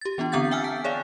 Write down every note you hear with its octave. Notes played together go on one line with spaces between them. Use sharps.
G4 A6
E3 B3 D4 F4
D3 B3 C4 F#5 G6 A6
E5 G5 G#5 E6 F6
A5 B6
G#4 C#5 D5 E5 F5